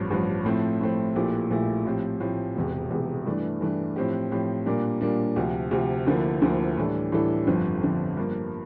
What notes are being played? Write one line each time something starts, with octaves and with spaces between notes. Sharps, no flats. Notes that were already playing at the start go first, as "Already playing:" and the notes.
Already playing: A1 G2 F3
A1 G2 F3
A2 F3 A3 C4
A2 F3 A3 C4
A#1 A#2 A3 E4 G4
A#1 A#2 A3 E4 G4
A2 F3 C4 G4
A2 F3 C4 G4
E1 E2 C3
E1 E2 C3
G2 E3 A3 D4
G2 E3 A3 D4
A2 F3 C4 G4
A2 F3 C4 G4
A#2 G3 A#3 D4
A#2 G3 A#3 D4
D2 C3 F3
D2 C3 F3
D2 D3 F3 A#3 E4
D2 D3 F3 A#3 E4
A2 E3 G3 D4 A4
A2 E3 G3 D4 A4
G1 F2 D3 F3
G1 F2 D3 F3
G2 F3 A#3